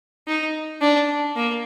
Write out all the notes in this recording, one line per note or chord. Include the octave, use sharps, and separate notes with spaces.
D#4
D4
A#3